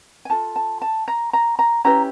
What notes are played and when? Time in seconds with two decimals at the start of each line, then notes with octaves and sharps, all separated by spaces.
0.25 G#5
0.30 F4 A4 A5
0.56 A5
0.82 A5
1.08 A#5
1.33 A#5
1.59 A#5
1.85 C#4 E4 G4 B4 A#5